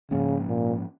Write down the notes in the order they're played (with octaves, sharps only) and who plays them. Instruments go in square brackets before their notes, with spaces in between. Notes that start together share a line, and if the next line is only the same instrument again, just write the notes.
[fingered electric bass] G#2 F3 A#3 C#4 [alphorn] C#3
[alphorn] A#2